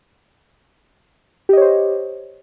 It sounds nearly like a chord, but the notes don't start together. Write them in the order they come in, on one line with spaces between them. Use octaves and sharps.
G4 D#5 C#5 C5